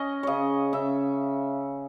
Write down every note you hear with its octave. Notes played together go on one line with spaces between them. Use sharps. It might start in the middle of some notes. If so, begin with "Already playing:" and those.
Already playing: C#4 D#5
C#3 C#5 D#5
C#3 E5